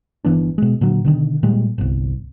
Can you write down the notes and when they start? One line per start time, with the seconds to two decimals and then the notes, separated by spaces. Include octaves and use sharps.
0.25 G1 E3 B3 D4
0.58 B2 G#3
0.81 A#2 D3 F#3
1.05 B2 D3 D#3
1.43 A#2 G3 G#3
1.78 G1 C2